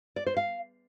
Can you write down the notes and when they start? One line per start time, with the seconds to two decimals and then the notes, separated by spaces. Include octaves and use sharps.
0.16 D5
0.26 C5
0.37 F5